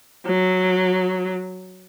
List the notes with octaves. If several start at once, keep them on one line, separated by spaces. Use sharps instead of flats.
F#3